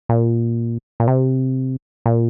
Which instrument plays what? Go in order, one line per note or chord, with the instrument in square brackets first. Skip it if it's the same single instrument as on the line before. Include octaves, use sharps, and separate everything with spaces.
[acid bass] A#2
A#2
C3
A#2